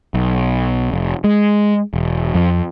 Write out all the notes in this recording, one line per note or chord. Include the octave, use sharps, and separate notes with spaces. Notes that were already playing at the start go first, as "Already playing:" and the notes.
B1
F1
G#3
E1
F2